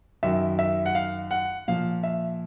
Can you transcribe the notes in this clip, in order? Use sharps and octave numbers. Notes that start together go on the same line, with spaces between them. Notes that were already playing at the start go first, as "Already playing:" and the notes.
F#2 D#3 E5
E5
F#5
F5
F#5
A#2 F3 F5
E5